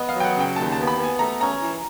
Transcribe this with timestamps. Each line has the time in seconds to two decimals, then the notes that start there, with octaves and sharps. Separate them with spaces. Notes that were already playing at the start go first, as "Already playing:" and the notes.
Already playing: B3 D#5
0.09 F5
0.14 F#3
0.20 G5
0.24 F#5
0.36 C#3 G5
0.56 D#2 A5
0.72 A5
0.78 B3
0.87 B5
0.98 B3
1.04 G#5
1.19 A3 A#5
1.41 C#4 A#5
1.62 E3